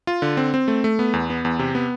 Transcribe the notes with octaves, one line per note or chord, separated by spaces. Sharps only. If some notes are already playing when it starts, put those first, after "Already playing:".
F4
D3
C4
C4
A3
A3
B3
E2
B3
E2
C3
B3